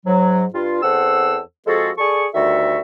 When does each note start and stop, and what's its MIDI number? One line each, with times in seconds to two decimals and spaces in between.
0.06 0.44 44
0.06 0.44 54
0.54 0.82 43
0.54 0.82 65
0.83 1.38 40
0.83 1.38 60
0.83 1.38 69
0.83 1.38 72
0.83 1.38 78
0.83 1.38 88
1.67 1.91 53
1.67 1.91 56
1.67 1.91 60
1.67 1.91 66
1.67 1.91 68
1.67 1.91 69
1.98 2.26 68
1.98 2.26 69
1.98 2.26 74
1.98 2.26 85
2.34 2.80 38
2.34 2.80 51
2.34 2.80 55
2.34 2.80 66
2.34 2.80 69
2.34 2.80 76